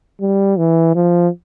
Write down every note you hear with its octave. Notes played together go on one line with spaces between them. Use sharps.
G3
E3
F3